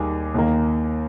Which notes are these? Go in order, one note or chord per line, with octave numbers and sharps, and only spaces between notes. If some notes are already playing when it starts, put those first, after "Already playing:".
Already playing: D#2 D#3 G3 A#3 G#4
D#2 D#3 A#3